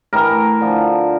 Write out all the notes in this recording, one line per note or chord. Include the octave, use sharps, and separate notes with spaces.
A2 E3 A#4
D3 F3